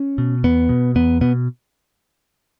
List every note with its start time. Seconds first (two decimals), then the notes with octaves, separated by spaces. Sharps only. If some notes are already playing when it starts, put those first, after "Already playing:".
Already playing: C#4
0.18 B2
0.44 E2 B3
0.69 B2
0.95 E2 B3
1.21 B2 B3